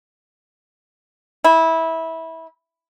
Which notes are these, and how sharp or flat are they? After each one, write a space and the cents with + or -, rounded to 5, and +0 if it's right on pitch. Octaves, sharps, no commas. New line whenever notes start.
E4 -20